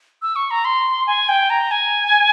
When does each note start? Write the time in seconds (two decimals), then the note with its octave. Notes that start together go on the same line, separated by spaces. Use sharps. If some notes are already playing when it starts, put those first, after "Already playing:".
0.22 E6
0.36 C#6
0.51 A#5
0.65 C6
1.07 G#5
1.29 G5
1.50 A#5
1.71 G#5